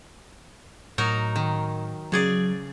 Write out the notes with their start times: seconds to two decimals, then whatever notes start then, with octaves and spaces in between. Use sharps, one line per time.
0.98 A2 F#3 D#4 A#4
1.36 D#3
2.12 C#3 F#3 G#4 D5